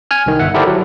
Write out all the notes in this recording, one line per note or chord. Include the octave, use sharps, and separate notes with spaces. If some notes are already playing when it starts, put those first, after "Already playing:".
G#5 F6
C2 D#3
G1 E5 F#5
E4 G4 A4 A#4 C5 D5
F#3